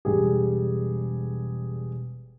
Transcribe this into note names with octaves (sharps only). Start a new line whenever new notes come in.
E1 G3 G#4